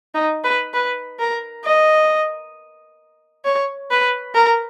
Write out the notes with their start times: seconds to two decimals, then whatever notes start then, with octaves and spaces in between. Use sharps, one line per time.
0.14 D#4
0.44 B4
0.74 B4
1.19 A#4
1.64 D#5
3.45 C#5
3.91 B4
4.35 A#4